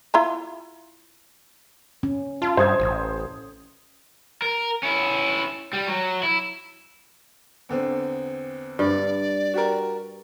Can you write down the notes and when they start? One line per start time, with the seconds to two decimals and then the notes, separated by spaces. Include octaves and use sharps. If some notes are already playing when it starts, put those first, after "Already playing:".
0.14 E4 F4 A#5
2.03 C#4
2.42 F4 A5
2.57 G2 C5 D#6 G#6
2.80 A1
4.42 A#4
4.83 C#4 E4
5.73 G3
5.88 F#3
6.23 E4
7.69 E2 D3 C4
8.79 G2 D5
9.54 F#4 G4 A#4